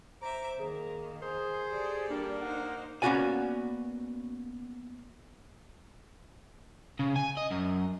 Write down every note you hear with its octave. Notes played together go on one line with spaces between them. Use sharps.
C5 E5 A#5 D6
D#3 A#3 G#4
G#4 C5 D#6
G4 A4 D5
G3 A#3 D4
D#4 C5 F#5
A#3 B3 C#4 F#4 D5 G#5
C#3
G#5
D#5
F#2